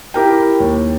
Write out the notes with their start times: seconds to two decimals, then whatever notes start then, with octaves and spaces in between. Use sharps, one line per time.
0.14 E4 G4 A#4 G5
0.60 D#2